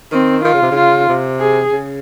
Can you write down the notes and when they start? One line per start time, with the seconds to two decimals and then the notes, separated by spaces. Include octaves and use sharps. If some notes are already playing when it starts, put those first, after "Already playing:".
0.12 D#3 C4
0.44 D#3 F4
0.54 C#3
0.62 C3
0.71 C#3 F4
1.08 C3
1.40 G#4
1.72 C#3